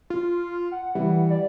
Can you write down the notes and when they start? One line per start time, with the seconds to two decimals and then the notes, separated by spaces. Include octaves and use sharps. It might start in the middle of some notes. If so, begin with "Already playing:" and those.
0.10 F4
0.71 F#5
0.95 E3 G3
1.30 D5